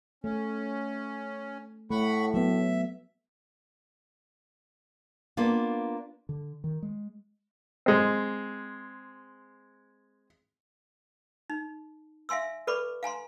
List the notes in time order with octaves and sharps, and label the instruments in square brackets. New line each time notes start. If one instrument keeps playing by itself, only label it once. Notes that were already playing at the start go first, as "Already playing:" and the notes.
[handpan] A3 [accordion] C#4
[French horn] A2 [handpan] A3 [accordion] F#5 B5 C#6
[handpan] F#3 B3 [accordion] E5
[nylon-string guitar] A#3 B3 D4 F4
[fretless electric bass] D3
D#3
G#3
[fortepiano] G#3 C4
[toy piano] D#4
E5 F5 G#5 C6 E6
A4 B4 D5 B5 C#6 D6
F5 G#5 A#5 C6